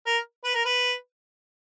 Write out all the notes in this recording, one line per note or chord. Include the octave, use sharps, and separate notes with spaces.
A#4
B4
A#4
B4